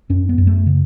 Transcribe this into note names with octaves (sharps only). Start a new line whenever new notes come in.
F#2 C#4
B3
F#2
A3
C#3